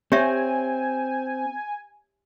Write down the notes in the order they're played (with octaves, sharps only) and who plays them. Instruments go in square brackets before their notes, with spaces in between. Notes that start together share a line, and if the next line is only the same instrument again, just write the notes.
[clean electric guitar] C4 [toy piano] G4 C#5 E5 [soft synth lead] G#5